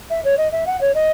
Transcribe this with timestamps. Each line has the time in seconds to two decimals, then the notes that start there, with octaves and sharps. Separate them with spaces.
0.10 E5
0.25 C#5
0.38 D#5
0.52 E5
0.67 F#5
0.81 C#5
0.95 D#5